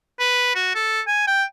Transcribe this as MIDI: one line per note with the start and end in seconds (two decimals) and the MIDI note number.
0.20 0.51 71
0.55 0.73 66
0.75 1.01 69
1.07 1.25 80
1.27 1.43 79